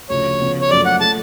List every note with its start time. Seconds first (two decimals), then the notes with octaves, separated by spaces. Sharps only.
0.09 D2 C#3 F3 C#5
0.40 C#3 F3 B3
0.61 C#5
0.70 F#1 F#2 F3 A3 D5
0.86 F#5
1.01 F3 A3 A5